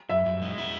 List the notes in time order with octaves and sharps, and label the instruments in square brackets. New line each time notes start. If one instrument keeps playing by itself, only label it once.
[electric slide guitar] F#2 [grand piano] E5
[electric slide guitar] F#2
G#3
E4